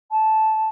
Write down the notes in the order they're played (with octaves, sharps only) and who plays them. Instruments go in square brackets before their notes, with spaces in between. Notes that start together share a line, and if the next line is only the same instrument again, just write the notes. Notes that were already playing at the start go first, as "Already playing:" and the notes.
[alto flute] A5